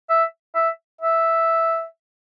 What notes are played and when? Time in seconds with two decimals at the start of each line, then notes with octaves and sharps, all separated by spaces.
0.09 E5
0.55 E5
1.01 E5